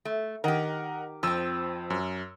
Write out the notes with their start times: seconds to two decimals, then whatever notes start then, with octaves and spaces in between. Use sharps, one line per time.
0.05 A3
0.44 D#3 G4 A#4 D#5 F#5
1.23 F2 F3 C4 E6
1.90 F#2